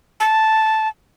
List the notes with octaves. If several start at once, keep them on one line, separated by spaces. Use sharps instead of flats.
A5